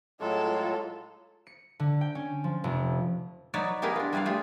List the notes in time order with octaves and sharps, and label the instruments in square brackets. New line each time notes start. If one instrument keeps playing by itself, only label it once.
[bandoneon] A2 F#3 G#3 [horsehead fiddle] F4 A4
[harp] C#7
D3
G5
C#4
F3
F1
[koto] F#3 D#4 B4 C#5 D5
B3 E4 G4 G#4 A#4 B4
D4 F4
G3 E4 B4 D5 F5
A3 F4 G4 G#4